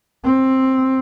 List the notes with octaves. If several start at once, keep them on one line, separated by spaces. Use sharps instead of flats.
C4